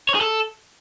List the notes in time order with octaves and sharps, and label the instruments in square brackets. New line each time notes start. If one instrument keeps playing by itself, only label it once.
[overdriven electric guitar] C#5
G#4
A4